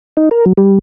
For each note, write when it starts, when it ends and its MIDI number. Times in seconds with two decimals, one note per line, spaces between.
0.17 0.29 63
0.31 0.45 70
0.46 0.53 54
0.58 0.79 55